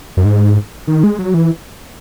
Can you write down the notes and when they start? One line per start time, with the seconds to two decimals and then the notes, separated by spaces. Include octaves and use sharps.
0.17 F#2
0.25 G#2
0.88 D#3
1.04 G#3
1.18 F#3
1.34 E3